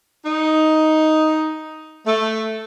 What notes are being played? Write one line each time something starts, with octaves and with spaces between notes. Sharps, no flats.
D#4
A3